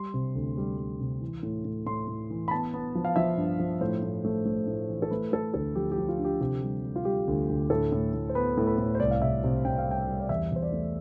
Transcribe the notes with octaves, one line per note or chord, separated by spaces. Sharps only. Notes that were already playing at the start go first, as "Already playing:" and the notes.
Already playing: G3 C6
C3
D2
G3
G3
C3
E3
A2
A2
A2 C6
A2
E3
B5
B3 A5
B3
F3
F5
F3 E5
G2
F3
A2 C5
A2
A3
A3
A2
E3
A4
A3 B4
A3 A4
D2 A4
F3 G4
G4
F3
F4
D3
G4
C3 G4
G3
G3
F4
G3 G4
D2
D2
A2 A4
A2
A2
C5
B3 B4
A2
B4
A2
C5
C2 D5
F5
C3 E5
C3
C3 G5
F5
G3 G5
G3
D5
E2 E5
E2 C5
D5
A3